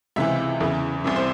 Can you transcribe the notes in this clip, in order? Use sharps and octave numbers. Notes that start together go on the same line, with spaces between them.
C#2 C3 E3 E5
E2 C#3 E3
C2 C3 E3
C5